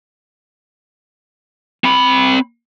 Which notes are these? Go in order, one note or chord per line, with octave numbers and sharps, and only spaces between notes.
C4 B5